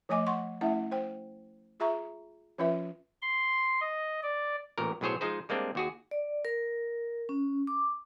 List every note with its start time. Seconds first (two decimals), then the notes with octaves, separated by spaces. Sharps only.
0.09 F3 A3 D#5 G#5 D6
0.27 F#5 C6 C#6
0.61 A3 C#4 E4 E5 F#5
0.91 C5 G5
1.80 F4 G#4 E5 A#5 C#6
2.58 F3 C#4 F4 B4 E5
3.22 C6
3.81 D#5
4.22 D5
4.78 A1 A#2 A#4
5.01 B1 A2 F#3 G#4 C5 C#5
5.21 F3 G#3 D#4 G#4 C5
5.49 G3 G#3 A#3 C4 D4
5.75 D#2 F#4 G#4
6.11 D5
6.45 A#4
7.29 C#4
7.67 D6